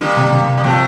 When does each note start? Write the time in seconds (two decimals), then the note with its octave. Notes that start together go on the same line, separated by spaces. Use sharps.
0.01 D3 G3 A#3
0.17 C3
0.32 C3
0.57 G3
0.64 C3 F3 A3